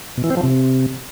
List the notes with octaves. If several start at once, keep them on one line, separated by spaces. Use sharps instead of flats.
B2
E3
C4
F3
C3